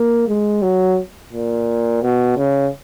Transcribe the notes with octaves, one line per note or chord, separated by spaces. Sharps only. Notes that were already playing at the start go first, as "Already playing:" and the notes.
Already playing: A#3
G#3
F#3
A#2
B2
C#3